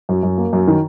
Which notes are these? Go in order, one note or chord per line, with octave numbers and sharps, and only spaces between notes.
F#2
F#2
A#3
F#2
D#3